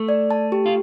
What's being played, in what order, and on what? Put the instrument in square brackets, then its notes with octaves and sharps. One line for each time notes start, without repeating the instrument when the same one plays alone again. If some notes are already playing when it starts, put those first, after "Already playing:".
Already playing: [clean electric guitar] A3
[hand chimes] D5
A5
G4
[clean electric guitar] F4